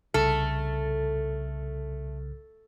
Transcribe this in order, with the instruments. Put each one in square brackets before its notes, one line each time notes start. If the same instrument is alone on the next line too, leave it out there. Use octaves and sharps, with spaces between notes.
[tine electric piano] C2 C#3 F6 [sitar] A3 [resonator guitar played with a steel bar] A4